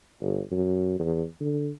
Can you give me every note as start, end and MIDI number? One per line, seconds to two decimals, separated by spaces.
0.22 0.40 31
0.51 0.98 42
0.99 1.24 40
1.40 1.69 50